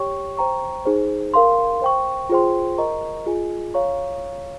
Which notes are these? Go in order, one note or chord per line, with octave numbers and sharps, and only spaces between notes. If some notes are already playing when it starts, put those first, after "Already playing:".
Already playing: G4 C#5 G5 C#6
C5 G5 A#5 C#6
D#4 G#4 C5
A#4 F5 C6
C5 G5 C#6
F4 G#4 C5 G5 C6
A#4 D#5 A#5 C#6
F4 G#4 D#5 G#5
C#5 F5 A#5 C#6